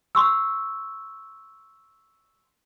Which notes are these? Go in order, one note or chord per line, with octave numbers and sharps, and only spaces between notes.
C6 C#6 E6